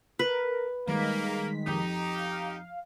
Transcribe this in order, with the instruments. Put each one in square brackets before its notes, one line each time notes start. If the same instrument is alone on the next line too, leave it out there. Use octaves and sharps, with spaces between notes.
[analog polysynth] A#4 [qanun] B4
[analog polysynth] D#3 G#3 B6 [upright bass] G3 [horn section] A#3
[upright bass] F2 [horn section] D#4 G4
[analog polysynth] F5